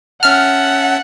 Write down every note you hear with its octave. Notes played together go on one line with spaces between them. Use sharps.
C#4 E5 F#5 A5 F6